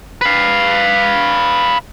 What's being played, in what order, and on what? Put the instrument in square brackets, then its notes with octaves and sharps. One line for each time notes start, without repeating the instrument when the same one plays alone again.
[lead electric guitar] B4 F5